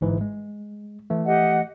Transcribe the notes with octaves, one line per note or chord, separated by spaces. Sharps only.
G1 G#2 E3
G#3
E3 A3
G4 D#5 F#5